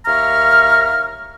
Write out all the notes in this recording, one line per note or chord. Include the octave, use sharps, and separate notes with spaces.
D#2 E5 F5 A#5 C#6 F6